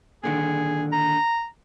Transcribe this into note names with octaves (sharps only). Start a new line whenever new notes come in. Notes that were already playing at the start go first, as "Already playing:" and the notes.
A#2 D3 D#3 G#4
A#5